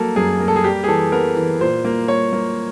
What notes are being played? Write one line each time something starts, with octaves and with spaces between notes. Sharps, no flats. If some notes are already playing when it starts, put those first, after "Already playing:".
Already playing: F#3 A#3 A4
F#2 G#4
A#3
A4
G#4
G3 G4
G#4
E3 A4
B3 A#4
E3
A#2 C5
A#3
A#3 C#5
A#3